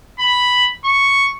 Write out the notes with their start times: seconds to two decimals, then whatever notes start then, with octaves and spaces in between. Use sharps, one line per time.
0.19 B5
0.85 C#6